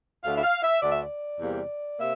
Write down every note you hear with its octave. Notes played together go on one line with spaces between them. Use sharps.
D2 D3 A3 F5
E5
F5
E5
D2 D3 A3 D5
E5
D5
E2 C3 G3 A#3
C3 A#3 E5